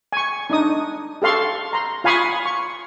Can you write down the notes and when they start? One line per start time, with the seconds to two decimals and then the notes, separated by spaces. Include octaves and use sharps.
0.12 G#5 C#6
0.50 D4 D#4 D#6
1.22 G4 A4 F5 C6 C#6
1.73 A#5 C6
2.04 F4 F5 G#5 B5 C#6 D#6
2.46 C#6